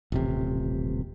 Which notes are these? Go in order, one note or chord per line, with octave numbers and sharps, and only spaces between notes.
D#1 A1 C3